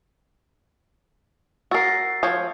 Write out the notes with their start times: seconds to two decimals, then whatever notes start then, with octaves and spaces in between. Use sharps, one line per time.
1.71 F#4 A#4 E6 A6 C7
2.23 F3 C#5